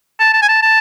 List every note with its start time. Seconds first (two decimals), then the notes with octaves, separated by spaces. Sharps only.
0.20 A5
0.34 A5
0.42 G#5
0.48 A5
0.63 A5